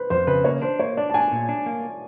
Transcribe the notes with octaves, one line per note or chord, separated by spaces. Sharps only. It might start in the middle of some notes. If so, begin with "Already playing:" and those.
Already playing: B4 C5
F2 C5
C#3 B4
A#3 C#5
D4 C5
A#3 C#5
D4 D5
A5
D4 G#5
A#2
D4
A#3